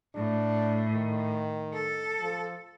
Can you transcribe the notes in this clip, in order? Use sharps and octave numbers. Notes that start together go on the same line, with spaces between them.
A2 D4
D#3
A4
F3